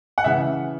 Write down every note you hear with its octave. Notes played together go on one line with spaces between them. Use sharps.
F#5
C#3 E3 E5